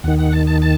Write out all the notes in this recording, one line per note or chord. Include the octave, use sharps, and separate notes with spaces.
D#2 D#3 F#5
F#5
A5
A5
A5